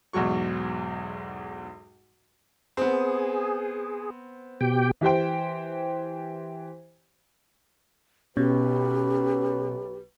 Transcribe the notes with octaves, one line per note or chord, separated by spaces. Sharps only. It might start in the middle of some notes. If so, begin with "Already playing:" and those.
B1 E2 G#2 F#3 C#6
B3 C4 G#4
B2 G4 G5
E3 G4 C5 G5
B1 B2 C#4 G4 B4